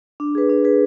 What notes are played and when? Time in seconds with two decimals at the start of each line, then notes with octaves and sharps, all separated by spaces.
0.20 D4
0.35 G#4 B4
0.49 D4
0.64 G#4 B4